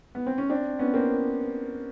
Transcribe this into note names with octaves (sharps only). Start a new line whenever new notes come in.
B3
C4
C#4
C4 D4
B3 C#4
A#3 C4